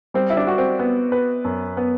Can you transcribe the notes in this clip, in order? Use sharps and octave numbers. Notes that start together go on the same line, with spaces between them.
G3 C4
E4
D4
F#4
C4
B3
B4
F#2
B3